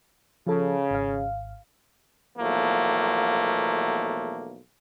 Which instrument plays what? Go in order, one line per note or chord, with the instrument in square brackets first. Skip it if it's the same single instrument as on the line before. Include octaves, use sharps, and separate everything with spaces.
[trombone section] C#3 [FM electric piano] F3 A4
[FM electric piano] G#1 F5
[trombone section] B1 E2 F3 A3 A#3